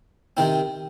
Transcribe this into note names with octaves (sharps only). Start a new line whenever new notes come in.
C3 D#3 C4